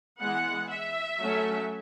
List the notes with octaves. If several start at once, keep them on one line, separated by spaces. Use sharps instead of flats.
E3 G#3 B3 F#5
E5
F#3 A3 C#4